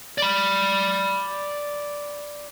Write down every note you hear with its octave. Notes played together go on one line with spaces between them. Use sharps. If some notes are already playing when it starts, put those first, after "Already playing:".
D5 B5